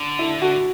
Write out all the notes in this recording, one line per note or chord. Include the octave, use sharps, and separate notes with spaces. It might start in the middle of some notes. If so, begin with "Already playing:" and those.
Already playing: D3
E4
F#4